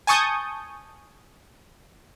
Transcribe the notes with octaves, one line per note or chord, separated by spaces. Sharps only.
G#5 A5 C#6 D#6 G6